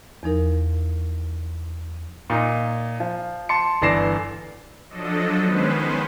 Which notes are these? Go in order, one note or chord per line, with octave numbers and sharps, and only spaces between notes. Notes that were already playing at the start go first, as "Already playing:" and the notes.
E2 F3 D#4 A#4
A#2 D#4
F3
A5 C6 C#7
G1 E3 D5 A#6 C7 E7
F3 F#3 D4 A4 D#5
D#3 G#3 B3 C#4 B4 C5